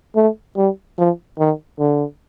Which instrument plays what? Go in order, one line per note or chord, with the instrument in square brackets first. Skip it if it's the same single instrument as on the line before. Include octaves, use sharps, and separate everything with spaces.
[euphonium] A3
G3
F3
D#3
D3